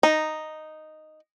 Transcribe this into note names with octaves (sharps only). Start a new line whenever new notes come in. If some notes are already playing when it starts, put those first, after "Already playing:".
D#4